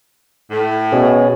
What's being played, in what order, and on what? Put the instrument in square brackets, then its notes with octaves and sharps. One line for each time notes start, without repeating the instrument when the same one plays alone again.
[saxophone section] A2
[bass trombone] B2 [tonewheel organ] C#4 G#4 C#5